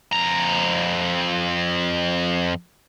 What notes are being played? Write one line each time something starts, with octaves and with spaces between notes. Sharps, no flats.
F2 A#5